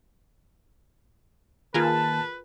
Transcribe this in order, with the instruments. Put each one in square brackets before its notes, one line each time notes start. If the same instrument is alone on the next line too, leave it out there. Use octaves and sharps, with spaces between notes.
[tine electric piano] D#3 A#3 A6 [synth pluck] F4 G#4 A#4 [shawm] B4 [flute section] A5